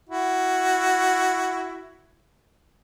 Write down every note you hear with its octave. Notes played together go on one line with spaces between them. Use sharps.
E4 F#4